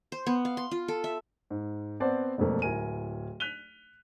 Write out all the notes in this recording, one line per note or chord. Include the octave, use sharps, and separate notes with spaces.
C5
B3
F5
C6
F4
A4
E5
G#2
B3 C4 C5 D5 F#5 A5
E1 F2 F3 A3 A#3
D1 E4 A#4 G#5 D#7
F#6 B6 D#7 F7 G7